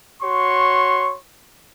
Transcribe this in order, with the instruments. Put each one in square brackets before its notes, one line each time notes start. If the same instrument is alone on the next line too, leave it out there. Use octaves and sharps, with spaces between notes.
[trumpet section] F#4 C#5 C6 C#6